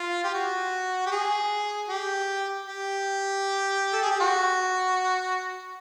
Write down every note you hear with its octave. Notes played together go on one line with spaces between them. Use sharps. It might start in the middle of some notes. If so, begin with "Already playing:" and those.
Already playing: F4
G4
F#4
G4
G#4
G4
G4
A4
G#4
G4
F#4